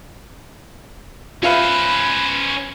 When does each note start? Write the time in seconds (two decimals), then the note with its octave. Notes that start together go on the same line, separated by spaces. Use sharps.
1.43 C#4 F4 B4 C5 E5 F5